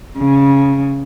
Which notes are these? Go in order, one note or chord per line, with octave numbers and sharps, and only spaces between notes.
C#3